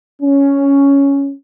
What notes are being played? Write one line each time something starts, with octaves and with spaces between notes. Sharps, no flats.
C#4